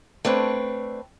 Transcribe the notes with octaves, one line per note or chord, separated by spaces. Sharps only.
A3 C4 D4 B4 C#5